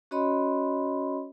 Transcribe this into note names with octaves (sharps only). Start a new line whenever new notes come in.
C#4 F#4 C#5 D#5 B5 C6